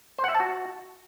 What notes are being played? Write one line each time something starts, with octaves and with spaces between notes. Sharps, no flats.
C5
F#5
E5
A5
F#4